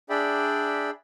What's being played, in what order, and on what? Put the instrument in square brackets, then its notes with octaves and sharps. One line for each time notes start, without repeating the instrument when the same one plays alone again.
[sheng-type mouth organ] D4 G#4 D5 E5 G5 B5